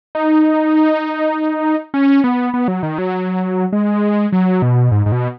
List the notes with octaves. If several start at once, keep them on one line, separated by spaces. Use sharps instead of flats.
D#4
C#4
B3
B3
F#3
D#3
F#3
G#3
F#3
B2
G#2
G#2
B2